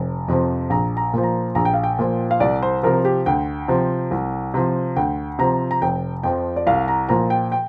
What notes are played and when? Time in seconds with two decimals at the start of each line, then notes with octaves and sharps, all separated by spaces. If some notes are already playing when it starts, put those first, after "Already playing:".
Already playing: F1
0.28 F2 C3 F3
0.70 A#1 A#5
0.97 A#5
1.13 A#2 F3
1.23 A#5
1.55 A#1 A#5
1.65 G5
1.74 F5
1.84 G5
1.99 A#2 F3
2.31 F5
2.40 C2 D5
2.63 C5
2.83 C3 F3 A#4
3.05 G4
3.26 D2 G5
3.68 C3 F3
4.11 C2
4.54 C3 F3
4.96 D2 G5
5.39 C3 F3 A#5
5.71 A#5
5.82 F1 G5
6.23 F2 F3 G5
6.56 D5
6.67 C2 F5
6.88 A#5
7.09 A#2 F3 A#5
7.30 G5
7.52 G5